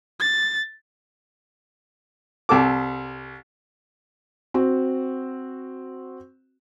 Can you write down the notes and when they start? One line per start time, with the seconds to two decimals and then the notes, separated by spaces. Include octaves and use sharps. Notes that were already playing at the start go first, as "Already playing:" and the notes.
0.20 A6
2.49 C2 A4 D6
4.54 C4 F#4